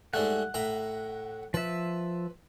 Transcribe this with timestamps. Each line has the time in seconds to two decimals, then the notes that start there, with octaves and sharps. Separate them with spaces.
0.14 G#2 G3 A3 F#5
0.54 A2 A#5 B5
1.54 F3 B4 E5